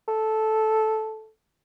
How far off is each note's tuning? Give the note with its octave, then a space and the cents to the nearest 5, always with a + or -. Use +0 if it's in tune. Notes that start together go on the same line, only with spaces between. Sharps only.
A4 -10